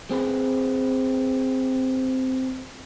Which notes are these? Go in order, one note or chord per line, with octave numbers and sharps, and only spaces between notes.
C4 G#4 B4